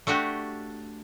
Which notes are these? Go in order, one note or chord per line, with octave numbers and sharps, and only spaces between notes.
A3 D4 F#4 G4